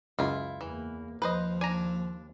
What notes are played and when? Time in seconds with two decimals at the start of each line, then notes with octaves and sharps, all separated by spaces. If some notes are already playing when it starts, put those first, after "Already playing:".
0.19 C#2 F#2 E4 F4
0.61 E2 E3 A#3
1.22 D#2 F3 B4 C5 D#5
1.61 D4 G#5 A#5